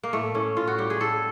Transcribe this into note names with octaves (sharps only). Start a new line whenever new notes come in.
A#3
A2 A3
A2 C#4
A2 F4
F#4
G3 G4
G#4
A2 A4